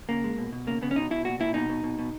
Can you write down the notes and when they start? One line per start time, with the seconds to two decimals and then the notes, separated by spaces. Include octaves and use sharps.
0.09 C#3 A#3
0.24 G#3
0.38 B2
0.52 B2
0.67 C#3 A#3
0.81 C#3 B3
0.91 C#4
0.96 B2 D#4
1.11 B2 E4
1.25 A#2 F#4
1.40 A#2 E4
1.54 B2 D#4
1.69 B2
1.83 B2
1.99 B2